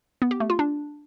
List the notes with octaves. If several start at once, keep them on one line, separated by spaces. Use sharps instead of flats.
B3
G4
A3
F4
D4